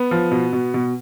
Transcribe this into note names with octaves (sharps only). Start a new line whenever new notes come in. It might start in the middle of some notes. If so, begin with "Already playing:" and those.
Already playing: B3
F3
B2
B2
B2